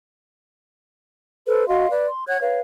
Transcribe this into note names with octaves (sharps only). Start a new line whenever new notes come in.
A4 B4 C5
F#4 D#5 F5 C6
B4 D5
C6
C#5 F#5 F#6 G#6
B4 C#5 F5